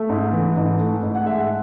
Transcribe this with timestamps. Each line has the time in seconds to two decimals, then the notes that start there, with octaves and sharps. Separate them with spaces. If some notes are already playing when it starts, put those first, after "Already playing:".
Already playing: A3 E5
0.09 G#2
0.33 E3
0.57 G#2
0.80 A3
1.03 G#2
1.15 F#5
1.25 G#3 E5
1.39 F#5